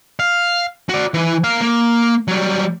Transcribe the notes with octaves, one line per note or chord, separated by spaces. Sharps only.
F5
F#4 D5
E3 E4
A#4 F5
A#3
F#3 G3